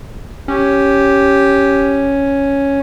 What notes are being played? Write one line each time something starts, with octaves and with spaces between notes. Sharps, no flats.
C#4 G4